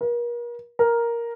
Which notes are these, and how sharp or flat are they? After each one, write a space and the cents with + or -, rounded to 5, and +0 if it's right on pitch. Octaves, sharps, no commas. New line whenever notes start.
A#4 +40
A#4 +5